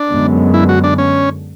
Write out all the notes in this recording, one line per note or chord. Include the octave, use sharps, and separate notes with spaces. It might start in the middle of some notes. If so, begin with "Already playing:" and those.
Already playing: D4
F#2 D3 G#3 B3
E4
F#4
D4
C#4